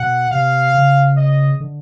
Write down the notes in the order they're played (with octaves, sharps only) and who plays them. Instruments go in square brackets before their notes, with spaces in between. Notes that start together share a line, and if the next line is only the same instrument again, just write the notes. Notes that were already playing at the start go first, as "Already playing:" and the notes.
Already playing: [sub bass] B2 [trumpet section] F#5
[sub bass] C3 [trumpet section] F5
[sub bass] C#3
[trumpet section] D#5
[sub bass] D3